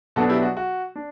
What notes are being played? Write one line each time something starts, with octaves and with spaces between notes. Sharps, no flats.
B2 F#3 B3 D4 F#4 A4
E4 G4
F#4
F#4
D4